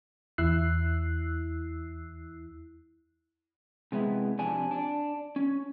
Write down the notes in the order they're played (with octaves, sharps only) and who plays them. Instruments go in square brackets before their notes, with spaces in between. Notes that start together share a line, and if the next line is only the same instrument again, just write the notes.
[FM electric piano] E2 E4 E6 F#6 C7
[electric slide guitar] C3 G#3 B3 E4
F2 C3 D4 G#5
D4
C#4